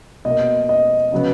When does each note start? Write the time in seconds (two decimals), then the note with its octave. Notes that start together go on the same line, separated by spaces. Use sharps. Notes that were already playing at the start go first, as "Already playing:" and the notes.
0.25 B2 A#3 D#5
0.69 D#5
1.12 C#3 F#3 B3